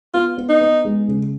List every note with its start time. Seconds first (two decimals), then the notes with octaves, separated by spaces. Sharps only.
0.14 B3 F4
0.38 B3
0.49 D#4
0.61 B3
0.85 G#3
1.08 C#3